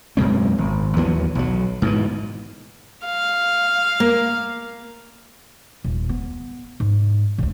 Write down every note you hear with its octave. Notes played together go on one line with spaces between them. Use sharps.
F#2 B2 G#3 C4
G#1
D#2 E3 F#3 B3
B1 F#3
G#2 B2 D3 E3
F5
A#3
D#1
B3
G#2
D2 C3